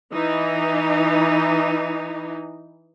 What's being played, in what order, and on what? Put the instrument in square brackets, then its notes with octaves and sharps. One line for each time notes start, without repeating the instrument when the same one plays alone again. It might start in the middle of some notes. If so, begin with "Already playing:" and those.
[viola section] E3 D#4